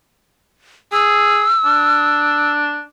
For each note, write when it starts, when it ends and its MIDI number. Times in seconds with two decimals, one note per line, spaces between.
0.93 1.46 68
0.93 2.52 88
1.65 2.83 62